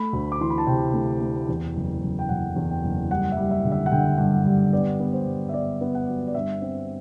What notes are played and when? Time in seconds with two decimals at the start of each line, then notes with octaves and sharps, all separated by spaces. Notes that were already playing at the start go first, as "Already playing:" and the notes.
Already playing: A3 B5
0.13 D2
0.32 D6
0.40 E3 C6
0.50 B5
0.58 A5
0.67 C3 G5
0.94 A3
1.21 A3
1.48 E2
1.76 F#1
2.02 F#1
2.19 G5
2.29 F#1 F#5
2.56 E2
2.70 G5
2.84 F#1
3.11 G3 F#5
3.31 E5
3.37 G3
3.51 E5
3.65 D3
3.72 E5
3.86 F#5
3.92 D3 G5
4.18 G2 F#5
4.45 G3
4.73 B3 D5
5.00 B3
5.13 C5
5.27 G2
5.49 E5
5.53 B3 D5
5.81 B3
5.95 F#5
6.08 F#3
6.27 D5
6.34 G2 E5
6.62 C4